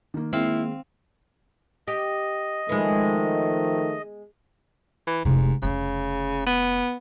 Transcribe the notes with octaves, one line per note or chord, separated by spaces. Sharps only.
D#3 A#3
D#3 G#3 A#3 C4 E4 F5
G4 D#5
D#3 F3 G#3 A3 B3
E3
F1 G#2 C3
F1 C#3 C#4
B3